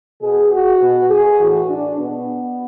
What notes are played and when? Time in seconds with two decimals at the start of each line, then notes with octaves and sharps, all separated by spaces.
0.22 B2 G#4
0.51 F#4
0.81 B2
1.10 G#4
1.40 A2 E3 F#4
1.69 D4
1.99 B2 B3